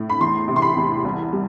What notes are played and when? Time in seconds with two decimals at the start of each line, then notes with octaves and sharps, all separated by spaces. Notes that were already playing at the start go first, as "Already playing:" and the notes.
Already playing: A2
0.10 B5
0.20 E2 C6
0.48 C3
0.56 C6
0.62 B5
0.77 E2
1.04 C2
1.33 G3